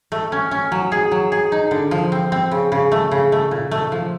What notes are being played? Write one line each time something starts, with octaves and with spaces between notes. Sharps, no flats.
A3
C#4
C#4
F#3
G#4
F#3
G#4
D#4
D3
F3
C4
C4
C#3
C#3
A3
C#3
A3
A#2
A3
F3